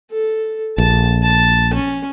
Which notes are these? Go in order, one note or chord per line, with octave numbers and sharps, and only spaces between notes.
A4
A#1 A5
A5
C#4